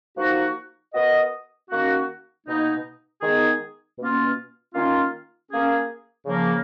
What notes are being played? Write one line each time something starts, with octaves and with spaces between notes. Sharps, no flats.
F3 A#3 D#4 F#4
B3 F#4 A#4 D#5
D#3 A#3 C#4 F#4
B2 A#3 D#4
D#3 G#3 B3 D#4 G#4
B2 A#3 C#4 F4
D#3 A#3 C#4 F4
A#3 C#4 G#4
C#3 F3 A#3